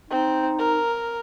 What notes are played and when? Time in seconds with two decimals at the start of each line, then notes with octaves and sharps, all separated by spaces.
0.10 C4 D#4
0.59 A#4